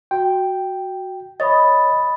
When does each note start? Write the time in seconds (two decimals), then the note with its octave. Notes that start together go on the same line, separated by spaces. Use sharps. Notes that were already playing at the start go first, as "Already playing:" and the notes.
0.11 F#4 G5
1.40 C#5 D#5 B5 D#6 A6